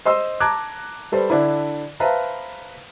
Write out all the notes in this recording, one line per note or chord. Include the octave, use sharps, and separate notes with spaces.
C5 D#5 C6 E6
A5 A#5 D6 F#6 G#6
G3 A4 B4 C5
D3 D4 E4
B4 C5 E5 F5 A5 A#5